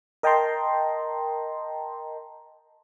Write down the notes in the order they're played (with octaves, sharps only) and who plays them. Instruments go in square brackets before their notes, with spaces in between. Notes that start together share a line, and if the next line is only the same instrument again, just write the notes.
[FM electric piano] A#4 D#5 G5 A5 A#5 C6